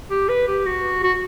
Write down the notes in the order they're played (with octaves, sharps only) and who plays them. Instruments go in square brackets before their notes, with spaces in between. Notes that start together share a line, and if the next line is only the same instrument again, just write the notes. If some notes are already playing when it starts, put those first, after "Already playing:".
[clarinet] G4
B4
G4
F#4
F#4